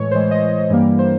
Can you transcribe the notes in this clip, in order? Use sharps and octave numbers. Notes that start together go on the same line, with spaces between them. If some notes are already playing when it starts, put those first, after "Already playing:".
Already playing: A2 E3 G#3 C#5
A2 E3 G#3 C5
D#5
G2 E3 G3 A#3
C5